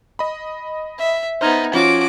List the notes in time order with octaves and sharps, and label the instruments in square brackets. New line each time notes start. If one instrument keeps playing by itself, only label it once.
[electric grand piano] D#5 B5
[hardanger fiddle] E5
[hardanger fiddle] B3 D#4 [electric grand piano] C5 F6 G#6
[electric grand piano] F3 C#4 F4 [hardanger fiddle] F#4 D6